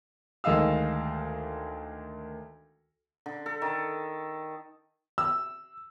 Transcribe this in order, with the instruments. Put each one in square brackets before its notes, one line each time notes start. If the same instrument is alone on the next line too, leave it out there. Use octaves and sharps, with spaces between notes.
[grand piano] D2 D#3 G#3 D#5 F5 E6
[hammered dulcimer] D3
A4
D#3
[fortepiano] E6